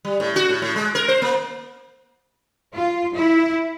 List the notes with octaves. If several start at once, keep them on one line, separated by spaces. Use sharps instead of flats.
G3
A2
F#4
A2
A2
G#3
A#4
C5
A#3
F4
E4